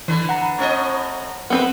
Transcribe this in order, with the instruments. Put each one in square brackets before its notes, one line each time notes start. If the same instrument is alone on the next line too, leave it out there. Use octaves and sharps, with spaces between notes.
[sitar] D3 B4 [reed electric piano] E3
[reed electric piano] F#5 A#5
[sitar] A2 C4 D#5
[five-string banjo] B3 C4 B4 [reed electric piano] F#5